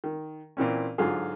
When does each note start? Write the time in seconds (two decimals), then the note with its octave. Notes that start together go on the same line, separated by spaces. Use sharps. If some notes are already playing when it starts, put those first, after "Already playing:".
0.04 D#3
0.57 A#2 E3 C4 C#4
0.98 G#2 D3 F#3 F4 G#4